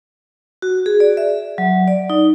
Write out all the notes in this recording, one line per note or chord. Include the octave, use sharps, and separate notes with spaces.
F#4
G#4
D5
E5
F#3
D5
D#4